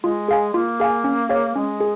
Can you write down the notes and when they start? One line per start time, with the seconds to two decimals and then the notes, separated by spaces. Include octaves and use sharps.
0.04 G#3 F4
0.28 G#4 F5 G#5
0.54 A#3 F4
0.80 G#4 F5 G#5
1.04 C#4
1.29 G#4 C#5 F5
1.56 G#3 C#4
1.80 G#4